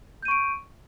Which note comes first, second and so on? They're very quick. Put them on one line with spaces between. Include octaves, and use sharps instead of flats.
G6 D#7 C#6 D7